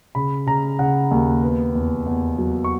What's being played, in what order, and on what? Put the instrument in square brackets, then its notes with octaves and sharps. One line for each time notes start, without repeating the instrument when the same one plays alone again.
[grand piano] C#3 B5
C#3 A#5
C#3 F#5
D#2
B3
E2
E2
F#3
C#6